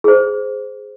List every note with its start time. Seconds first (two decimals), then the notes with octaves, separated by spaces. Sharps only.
0.04 G#4 C5